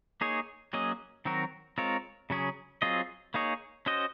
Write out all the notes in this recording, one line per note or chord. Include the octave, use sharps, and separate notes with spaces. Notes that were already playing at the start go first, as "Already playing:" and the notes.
A#3 D#4 G#4 C#5
F#3 A#3 C#4 G#4 D#5
D#3 F#3 C4 F#4 A#4
G#3 C4 F4 A#4 C#5
C#3 F#3 C#4 G#4
F#3 C4 F4 G#4 D#5
A#3 D#4 G#4 C#5
C#4 F#4 C5 D#5